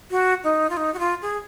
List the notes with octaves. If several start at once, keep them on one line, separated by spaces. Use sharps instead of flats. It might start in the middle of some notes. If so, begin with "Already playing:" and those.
F#4
D#4
F4
D#4
F#4
F4
G#4